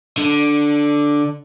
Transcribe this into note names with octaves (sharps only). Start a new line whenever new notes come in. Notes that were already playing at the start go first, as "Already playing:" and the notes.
D3